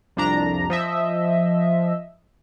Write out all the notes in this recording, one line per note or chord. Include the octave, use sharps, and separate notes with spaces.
C2 F2 D4 A#5
F3 D#5 E5